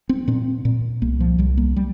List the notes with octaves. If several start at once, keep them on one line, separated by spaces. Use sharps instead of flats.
C4
A#2 C4
A#2
C2 A#3
F3
C2 G3
A#3
G3